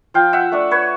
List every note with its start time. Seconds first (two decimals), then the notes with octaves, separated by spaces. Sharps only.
0.14 F3 F5 G5
0.33 E5 F#5
0.52 A3 D4
0.71 B4 C#5